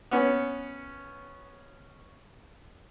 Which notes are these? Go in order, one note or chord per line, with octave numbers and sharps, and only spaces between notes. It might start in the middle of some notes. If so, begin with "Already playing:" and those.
B3 C#4